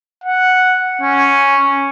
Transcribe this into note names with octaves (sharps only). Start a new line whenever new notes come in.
F#5
C#4